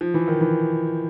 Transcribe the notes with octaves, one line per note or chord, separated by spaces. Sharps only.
F3
E3
D#3
E3